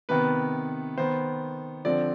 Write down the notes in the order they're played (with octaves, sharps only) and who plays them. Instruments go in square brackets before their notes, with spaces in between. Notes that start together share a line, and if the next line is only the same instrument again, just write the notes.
[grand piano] C3 D#3 B3 B4
D#3 B3 C5
D3 F3 C4 D5